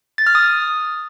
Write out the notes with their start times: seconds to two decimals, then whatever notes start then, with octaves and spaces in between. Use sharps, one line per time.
0.18 A6
0.27 F6
0.35 D#6